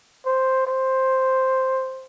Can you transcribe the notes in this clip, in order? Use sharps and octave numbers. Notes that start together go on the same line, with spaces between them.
C5
C5